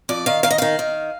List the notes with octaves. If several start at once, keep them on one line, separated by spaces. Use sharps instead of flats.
F2 D5
D#3 F5
D#3 F5
D#5
D#3 F5
D#3